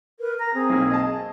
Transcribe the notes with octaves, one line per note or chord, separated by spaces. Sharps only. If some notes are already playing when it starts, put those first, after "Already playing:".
A#4 B4
A#5 A#6
C4 G#4
B1 A#3
D#5 A5